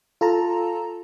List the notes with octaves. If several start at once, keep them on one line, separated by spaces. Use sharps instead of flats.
F4 A4 A5 A#5